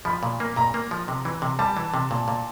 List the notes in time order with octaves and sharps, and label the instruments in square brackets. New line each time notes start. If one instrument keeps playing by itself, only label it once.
[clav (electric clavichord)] F3 [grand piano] B5
[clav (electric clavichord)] A#2
A#3
[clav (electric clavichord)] A#2 [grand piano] A#5
[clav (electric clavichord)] A#3
F3
C3
E3
C3
[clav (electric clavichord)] G3 [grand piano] A5
[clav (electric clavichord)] E3
C3
A#2
A#2